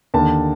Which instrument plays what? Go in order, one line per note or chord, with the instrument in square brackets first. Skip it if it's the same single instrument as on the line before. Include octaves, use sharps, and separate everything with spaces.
[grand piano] D#2 D3 A5